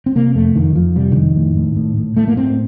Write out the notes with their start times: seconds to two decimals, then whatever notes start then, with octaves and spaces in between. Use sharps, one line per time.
0.06 C4
0.15 C3 A#3
0.35 F2 A3
0.56 F2 D#3
0.75 F2 F3
0.95 C3 G3
1.12 D3
1.16 F2 D#3
1.36 A2
1.56 A2
1.76 A2
1.97 A2
2.17 A2 A3
2.28 A#3
2.36 A2 C4